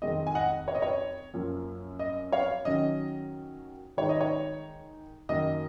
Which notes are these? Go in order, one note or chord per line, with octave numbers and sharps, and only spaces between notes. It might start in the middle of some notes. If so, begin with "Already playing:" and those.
F2 D#3 G#3 C4 D#5
G#5
D#5 F#5
C#5
D#5
C#5
F#2 F3 A#3
D#5
C#5 F5
D#3 F#3 C#4 D#5
D#3 G#3 D#4 C#5
D#5
C#5
F#2 D#3 F#3 A#3 D#5